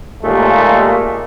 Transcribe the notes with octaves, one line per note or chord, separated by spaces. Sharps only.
D#2 A#2 G#3 A3